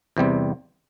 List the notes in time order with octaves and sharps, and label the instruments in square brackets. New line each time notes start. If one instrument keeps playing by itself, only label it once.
[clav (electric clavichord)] E2 C3 G3 C4